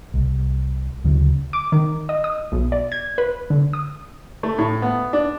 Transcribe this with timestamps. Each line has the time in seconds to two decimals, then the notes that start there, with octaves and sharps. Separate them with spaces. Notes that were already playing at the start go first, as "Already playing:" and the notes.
0.14 C2
1.04 D2 C#3 F#3
1.53 D6
1.72 D#3
2.09 D#5
2.24 D#6
2.52 B1
2.72 D5
2.92 G#6
3.18 B4
3.50 D3
3.73 D#6
4.43 A3
4.58 A2
4.82 B3
5.13 D4